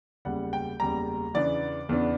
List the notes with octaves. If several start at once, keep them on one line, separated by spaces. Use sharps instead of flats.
F#1 E2 C#3 G3 F#5
G5
F#1 E2 C#3 G3 A#5
E2 C#3 E3 B3 D4 D5
E2 C#3 E3 B3 D4